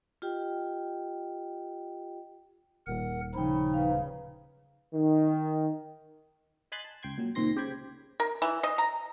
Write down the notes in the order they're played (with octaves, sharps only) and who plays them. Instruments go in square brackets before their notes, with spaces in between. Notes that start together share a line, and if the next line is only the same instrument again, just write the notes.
[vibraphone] F4 G4 D#5 G5
[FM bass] D#1 [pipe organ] A#4 F#5
[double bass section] C#3 [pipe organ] F3 D#4 [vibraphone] G5 B5
[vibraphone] B4 F5
[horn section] D#3
[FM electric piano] D#5 G#5 B5 C6 F#6 A6
A5
C#2 G5 C6 G#6
A#2 F#3
C#2 A#2 D#3 C4 C6 A#6
C#3 G4 C5 G5 B5 G#6
[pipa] A#4
E3
D#5
A#5